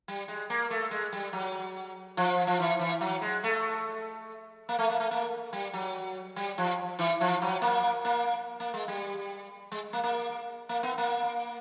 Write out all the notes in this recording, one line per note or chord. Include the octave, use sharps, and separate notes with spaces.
G3
G#3
A#3
A3
G#3
G3
F#3
F3
F3
E3
E3
F#3
G#3
A3
A#3
A3
A#3
A3
A#3
G3
F#3
G3
F3
E3
F3
F#3
A#3
A#3
A#3
G#3
G3
G#3
A#3
A#3
A#3
B3
A#3